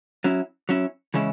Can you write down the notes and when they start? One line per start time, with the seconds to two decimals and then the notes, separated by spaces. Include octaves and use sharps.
0.24 F#3 C#4 E4
0.69 F#3 C#4 E4
1.14 C#3 E3 G#3 C#4 E4